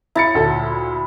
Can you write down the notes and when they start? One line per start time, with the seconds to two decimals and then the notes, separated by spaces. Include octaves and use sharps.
0.15 E4 A#5 A6 C#7
0.35 D2 A#2 A4